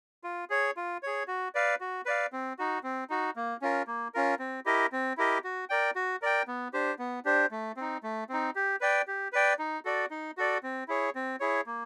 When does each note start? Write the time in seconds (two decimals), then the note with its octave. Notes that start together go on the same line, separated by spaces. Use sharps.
0.24 F4
0.50 G#4 C#5
0.77 F4
1.03 G#4 C#5
1.28 F#4
1.55 B4 D5 F5
1.81 F#4
2.06 B4 D5 F5
2.33 C4
2.59 D#4 F#4
2.83 C4
3.10 D#4 F#4
3.36 A#3
3.62 C#4 F4 A#4
3.87 A#3
4.14 C#4 F4 A#4
4.39 C4
4.66 E4 G4 A#4 D#5
4.92 C4
5.17 E4 G4 A#4 D#5
5.44 F#4
5.70 A#4 D5 G5
5.95 F#4
6.22 A#4 D5 G5
6.47 B3
6.73 D4 G4 C5
6.99 B3
7.25 D4 G4 C5
7.51 A3
7.77 C4 D#4
8.03 A3
8.29 C4 D#4
8.55 G4
8.81 B4 D5 G5
9.08 G4
9.33 B4 D5 G5
9.59 D#4
9.85 F#4 A4 D5
10.10 D#4
10.37 F#4 A4 D5
10.63 C4
10.88 E4 G#4 C#5
11.15 C4
11.40 E4 G#4 C#5
11.66 A#3